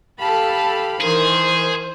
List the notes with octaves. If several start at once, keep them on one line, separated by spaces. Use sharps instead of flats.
G4 A4 F5 A5 B5
D#3 E3 G#4 C5